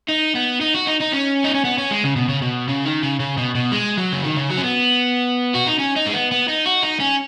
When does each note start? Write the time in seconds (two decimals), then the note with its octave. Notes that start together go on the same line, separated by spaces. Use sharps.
0.09 D#4
0.35 B3
0.61 D#4
0.74 F#4
0.87 D#4
1.00 D#4
1.13 C#4
1.44 D#4
1.54 C#4
1.65 B3
1.78 C#4
1.91 G#3
2.04 C#3
2.16 B2
2.29 C#3
2.42 B2
2.69 C#3
2.85 D#3
3.03 C#3
3.20 C#3
3.38 B2
3.55 B2
3.72 G#3
3.98 F#3
4.12 C#3
4.24 D#3
4.36 C#3
4.50 F#3
4.57 C#4
4.63 B3
5.55 F#4
5.67 D#4
5.79 C#4
5.96 D#4
6.06 G#3
6.13 B3
6.32 B3
6.48 D#4
6.66 F#4
6.83 D#4
7.00 C#4